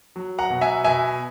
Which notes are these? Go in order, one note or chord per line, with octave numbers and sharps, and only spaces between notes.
F#3
F#5 A#5
B2
E5 G#5
B2 E5 G#5